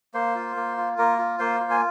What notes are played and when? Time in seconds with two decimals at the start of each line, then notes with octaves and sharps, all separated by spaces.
0.14 A#3 C5
0.35 F4
0.56 A#3
0.77 F4
0.98 A#3 A#4
1.19 F4
1.39 A#3 C5
1.60 F4
1.70 G#5